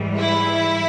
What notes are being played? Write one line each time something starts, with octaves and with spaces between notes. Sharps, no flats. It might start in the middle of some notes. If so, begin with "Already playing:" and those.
Already playing: G#2 E3 G3
E4